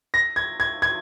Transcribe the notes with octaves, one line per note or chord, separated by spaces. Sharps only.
A#6
G#6
G#6
G#6